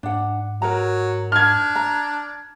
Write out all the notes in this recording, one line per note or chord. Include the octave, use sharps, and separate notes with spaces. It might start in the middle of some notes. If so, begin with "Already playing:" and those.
G#2 D4 F#5
F#3 A#4 B4 A#5
D4 F6 G#6
A#5